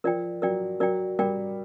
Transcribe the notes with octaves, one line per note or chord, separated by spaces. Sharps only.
F3 A#4 D5 G5
F#3 A#4 D5 G5
F#3 A#4 D5 G5
G3 A#4 D5 G5